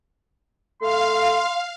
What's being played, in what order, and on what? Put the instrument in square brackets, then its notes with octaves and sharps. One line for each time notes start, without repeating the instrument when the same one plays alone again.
[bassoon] A3 [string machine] F5 [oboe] C6